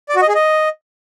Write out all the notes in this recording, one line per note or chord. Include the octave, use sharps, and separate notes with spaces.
D5
F#4
D#5
G#4
D#5